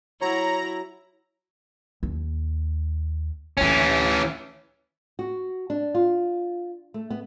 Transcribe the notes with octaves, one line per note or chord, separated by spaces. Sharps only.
F#3 E4 C#5 A#5
D#2
D2 E3 C#4 D4
F#4
D4
F4
A3
B3